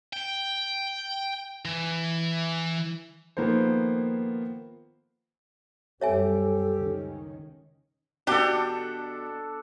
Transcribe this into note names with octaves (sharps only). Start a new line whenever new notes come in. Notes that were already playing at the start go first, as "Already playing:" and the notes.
G5
E3
D#3 F3 A#3 B3 A4 C5
F#2 G3 C4 G4 A4 C#5 E5 G#5
C#2 D#3 C#4
B2 D4 G4 A4